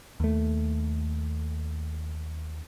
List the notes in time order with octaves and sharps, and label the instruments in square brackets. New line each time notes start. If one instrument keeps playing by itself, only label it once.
[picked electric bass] D#2 A3